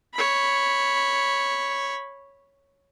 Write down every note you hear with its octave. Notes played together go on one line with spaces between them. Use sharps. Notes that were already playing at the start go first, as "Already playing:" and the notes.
C#5 B5